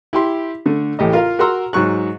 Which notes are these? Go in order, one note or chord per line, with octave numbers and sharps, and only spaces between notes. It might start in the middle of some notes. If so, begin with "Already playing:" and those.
E4 G4 C6
D3 A3
A1 A2 G4 D#5
F4 A#4 F5
F#4 A#4 F#5 A#5 C6 E6
G#2 F#3 C#6 F#6